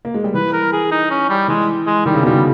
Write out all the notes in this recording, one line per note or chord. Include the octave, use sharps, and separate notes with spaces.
A#3
G#3
G3
E3 B4
A#4
G#4
D#4
C#4
G3
E3 G#3
G#3
D#3 G3
C#3
B2 G3
C#3